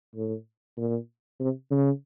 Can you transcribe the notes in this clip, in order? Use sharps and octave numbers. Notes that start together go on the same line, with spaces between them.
A2
A#2
C3
C#3